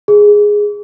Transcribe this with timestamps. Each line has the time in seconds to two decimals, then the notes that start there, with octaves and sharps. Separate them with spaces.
0.08 G#4